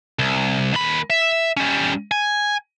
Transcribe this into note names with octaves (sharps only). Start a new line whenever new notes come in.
C2
D#2 B5
E5
G3 C#4
G#5